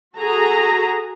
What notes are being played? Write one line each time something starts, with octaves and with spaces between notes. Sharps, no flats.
F#4 G#4 A4 A#5